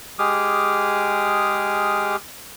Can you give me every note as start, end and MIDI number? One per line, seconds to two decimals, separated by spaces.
0.19 2.16 56
0.19 2.16 67
0.19 2.16 68
0.19 2.16 86
0.19 2.16 87
0.19 2.16 89